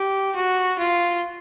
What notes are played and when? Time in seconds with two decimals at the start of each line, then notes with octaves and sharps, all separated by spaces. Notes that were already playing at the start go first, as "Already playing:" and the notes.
Already playing: G4
0.36 F#4
0.79 F4